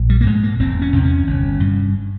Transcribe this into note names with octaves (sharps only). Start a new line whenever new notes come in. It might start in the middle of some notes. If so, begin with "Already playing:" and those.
Already playing: A#1
G3
A#3
G#2 G#3
A#3
E1 C4
C#4
E2 C3
C#4
G1
G2